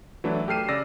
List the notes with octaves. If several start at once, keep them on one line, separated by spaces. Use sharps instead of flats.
E3 F#3 A3 D4 E4
G4 A4 F6 C7 D#7 E7
C#3 D5 D6 E6 A#6